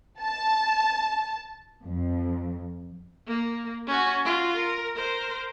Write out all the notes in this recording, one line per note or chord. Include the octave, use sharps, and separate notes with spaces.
A5
F2
A#3
C#4 F#4
F4 F#4
A#4
A#4 C5